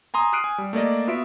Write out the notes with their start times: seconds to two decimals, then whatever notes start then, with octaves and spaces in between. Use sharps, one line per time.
0.14 G#5 A#5 C6 D#6
0.33 D#6 F6 F#6 C7 D7 D#7
0.44 G#5
0.58 G3
0.73 A3 A#3 D5 D#5
1.08 B3 F4 F#4 E5 D7